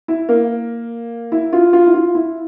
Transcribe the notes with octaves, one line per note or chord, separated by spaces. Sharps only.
E4
A#3
E4
F4
F4
E4
F4
E4